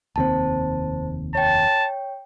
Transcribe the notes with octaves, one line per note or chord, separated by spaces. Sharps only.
F1 D#2 C4 C5 A5
C#5 G5 A5